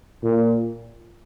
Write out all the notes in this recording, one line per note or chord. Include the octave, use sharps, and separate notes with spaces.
A#2